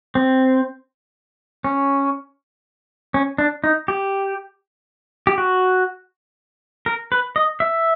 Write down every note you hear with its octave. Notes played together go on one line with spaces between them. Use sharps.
C4
C#4
C#4
D4
D#4
G4
G4
F#4
A#4
B4
D#5
E5